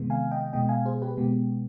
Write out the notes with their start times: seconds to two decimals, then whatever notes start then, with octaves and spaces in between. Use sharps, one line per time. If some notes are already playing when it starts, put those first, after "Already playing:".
Already playing: C3 D#3 G#3 B3
0.10 F5 G#5
0.31 D#5 G5
0.53 B2 G#3 B3 D#5 G5
0.69 F5 G#5
0.85 G#4 C5
1.02 G4 B4
1.17 B2 G#3 B3 G4